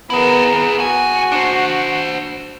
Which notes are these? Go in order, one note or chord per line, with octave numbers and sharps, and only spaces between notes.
B3 E4 G#4 A#4
D#2 F#4 G#5
D4 C5